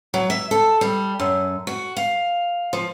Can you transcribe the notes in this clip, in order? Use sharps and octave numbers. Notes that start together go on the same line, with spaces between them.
F#3
E5
A4
G3
F#2
F#4
F5
F3